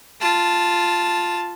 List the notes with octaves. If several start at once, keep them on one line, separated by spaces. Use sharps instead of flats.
F4 A5